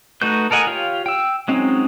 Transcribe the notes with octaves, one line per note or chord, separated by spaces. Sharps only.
A3 D#4 F#4 B4 G6
A4 A#4 D#5 F#5 G#5
F4 G4 C#5 F5
G5 E6
F#3 G#3 C4 C#4 D#4